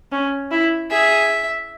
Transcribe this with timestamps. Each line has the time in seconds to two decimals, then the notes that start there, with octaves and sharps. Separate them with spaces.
0.12 C#4
0.51 E4
0.91 G#4 E5